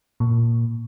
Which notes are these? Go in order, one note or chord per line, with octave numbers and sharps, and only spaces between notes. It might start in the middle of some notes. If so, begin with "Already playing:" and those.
A#2